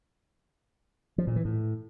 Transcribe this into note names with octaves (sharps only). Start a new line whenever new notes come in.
F3
A#2
E3
A2